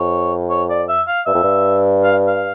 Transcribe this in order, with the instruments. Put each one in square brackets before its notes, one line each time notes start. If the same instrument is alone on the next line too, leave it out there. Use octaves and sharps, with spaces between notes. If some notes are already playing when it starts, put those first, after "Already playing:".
Already playing: [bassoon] F2 [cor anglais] C#5
[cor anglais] C#5
D5
E5
F5
[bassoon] G2 [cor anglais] E5
[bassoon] F2
G2
[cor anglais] F5
F5